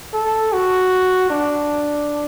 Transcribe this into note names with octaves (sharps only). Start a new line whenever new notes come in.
A4
F#4
D4